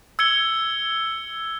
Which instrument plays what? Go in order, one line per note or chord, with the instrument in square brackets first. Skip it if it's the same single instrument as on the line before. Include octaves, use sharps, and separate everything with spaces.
[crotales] E6 G#6 C#7 G7